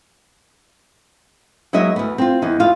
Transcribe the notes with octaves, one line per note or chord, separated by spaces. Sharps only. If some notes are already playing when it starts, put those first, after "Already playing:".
F#3 G#3 A#3 D#4 D#5 E5
D2 B3
C4 F4
E2 D#4
D2 F4 B4 F5